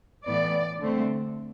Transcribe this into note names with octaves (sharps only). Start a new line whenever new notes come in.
A2 E3 B3 D5
D3 A3 C4